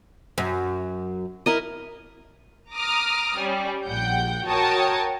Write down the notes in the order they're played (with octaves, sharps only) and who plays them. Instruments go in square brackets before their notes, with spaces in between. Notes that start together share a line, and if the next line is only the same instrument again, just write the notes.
[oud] F#2
[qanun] E4 A#4 D#5
[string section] A#5 D6 D#6 F6
G3 C#4
A#1 A#2 F#5 G5 G6
F#4 A#4 C#5 G5 A5 D#6